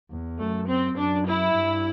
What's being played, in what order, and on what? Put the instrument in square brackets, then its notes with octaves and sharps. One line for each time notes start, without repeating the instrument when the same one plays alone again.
[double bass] E2
[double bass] F#2 [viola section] A3
[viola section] C4
[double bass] F#2 [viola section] D4
[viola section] E4
[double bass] G2